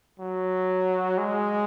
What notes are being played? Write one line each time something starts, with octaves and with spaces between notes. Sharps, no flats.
F#3
G#3